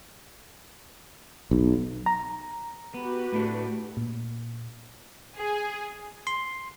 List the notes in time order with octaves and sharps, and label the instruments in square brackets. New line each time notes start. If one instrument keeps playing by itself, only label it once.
[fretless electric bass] B1
[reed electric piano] A#5
[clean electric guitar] B3 [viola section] F#4 G4 B4
[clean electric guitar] A2 A3 D4
[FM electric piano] A#2
[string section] G#4
[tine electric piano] C6